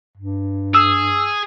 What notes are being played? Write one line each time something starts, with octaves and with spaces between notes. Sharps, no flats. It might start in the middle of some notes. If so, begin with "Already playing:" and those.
G2
G#4 E6